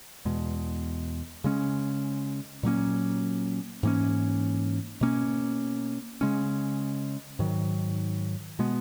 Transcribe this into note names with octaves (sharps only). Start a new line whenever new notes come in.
E2 B2 G#3
C#3 G#3 C#4
A#2 F#3 A#3 C#4
G#2 E3 A#3 C#4
B2 A#3 C#4
C#3 G#3 C#4
G#2 D#3 F#3
B2 G#3 B3